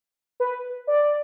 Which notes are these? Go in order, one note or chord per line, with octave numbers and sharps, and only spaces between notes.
B4
D5